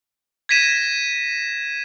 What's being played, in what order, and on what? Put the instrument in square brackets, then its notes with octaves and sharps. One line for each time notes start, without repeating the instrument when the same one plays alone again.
[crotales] G#6 A#6 B6 D#7 E7